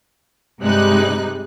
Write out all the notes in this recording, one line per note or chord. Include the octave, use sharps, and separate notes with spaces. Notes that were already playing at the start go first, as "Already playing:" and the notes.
G2 C3 G3 G#3 D#4 F#6